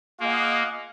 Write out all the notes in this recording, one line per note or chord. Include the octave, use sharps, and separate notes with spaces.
A#3 F4 G#4 D#5 F#5